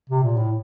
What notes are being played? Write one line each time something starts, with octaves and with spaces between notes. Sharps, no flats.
C3
A#2
A2